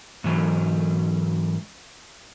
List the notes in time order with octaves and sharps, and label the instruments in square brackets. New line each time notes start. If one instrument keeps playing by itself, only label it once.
[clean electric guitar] G#2 E3 F#3